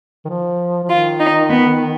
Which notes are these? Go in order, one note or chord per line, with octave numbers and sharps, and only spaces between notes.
D#3
F3
F3
D#3 F4
D#4
B3